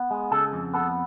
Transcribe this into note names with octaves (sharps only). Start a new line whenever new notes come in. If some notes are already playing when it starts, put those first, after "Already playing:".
Already playing: B3
G#3
C#3 A4
F2
B3 A4